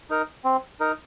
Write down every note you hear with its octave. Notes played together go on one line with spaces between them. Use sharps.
D#4 A#4
C4
D#4 A#4